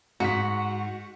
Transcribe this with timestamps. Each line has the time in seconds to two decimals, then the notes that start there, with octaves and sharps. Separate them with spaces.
0.20 G#2 F#4 F#5 B6